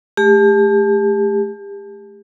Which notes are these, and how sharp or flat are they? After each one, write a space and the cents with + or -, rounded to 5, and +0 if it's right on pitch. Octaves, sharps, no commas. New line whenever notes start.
A3 -20 G4 +35